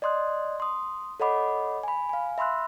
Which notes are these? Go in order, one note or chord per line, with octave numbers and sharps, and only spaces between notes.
D5 D#5 C6 D#6 F#6
C6 D#6
A4 C#5 D#5 F#5 B5 D6
G#5 B5
F5 G#5
E5 B5 C6 E6 F#6